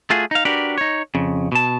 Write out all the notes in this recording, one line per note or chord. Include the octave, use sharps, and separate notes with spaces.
A3 F4 F#4 G#4
D#4 F5
D4 F#4 G4 A#4 B4 D5
D#4 C#5
F2 C#3
B2 A5